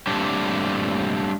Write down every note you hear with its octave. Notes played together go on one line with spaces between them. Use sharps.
G3 A3 A#3 C4 D4 G4